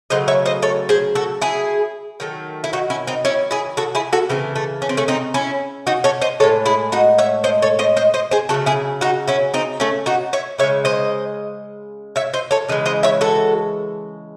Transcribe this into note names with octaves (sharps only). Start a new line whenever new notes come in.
C#3 F#3 A3 C5 D#5
C#5 E5
C5 D#5
A4 C#5
G#4 C5
F#4 A4
E4 G#4
D#3 F#3 A3
E4
D#4 F#4
C#4 E4
C4 D#4
C#4 E4
E4 G#4
F#4 A4
E4 G#4
F#4 A4
C#3 E3 A3 C4
A3
C#4
C4
A3 C#4
C4 D#4
C#4 E4
D#4 F#4
A4 C#5
C5 D#5
A2 E3 G#3 A4 C#5
E4 G#4
D#4 F#4
C#5 E5
C5 D#5
A4 C#5
C5 D#5
C5 D#5
C5 D#5
G#4 C5
C#3 F#3 A3 F#4 A4
E4 G#4
D#4 F#4
C#4 E4
C4 D#4
A3 C#4
D#4 F#4
C#5 E5
C#3 G#3 C#5 E5
C5 D#5
C#5 E5
C5 D#5
A4 C#5
C#3 E3 G#3 D#5
C5 D#5
C#5 E5
F#4 A4